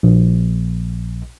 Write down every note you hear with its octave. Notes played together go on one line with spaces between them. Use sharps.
A#1